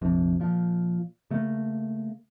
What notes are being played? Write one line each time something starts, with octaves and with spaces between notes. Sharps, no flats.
A#1 F2 C3
A#2 F3
C#3 A3 A#3